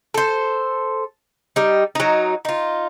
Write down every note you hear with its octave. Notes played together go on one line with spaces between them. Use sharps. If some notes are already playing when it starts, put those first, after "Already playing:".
A4 C5
G3 D#4
F#3 D#4
D#4 F4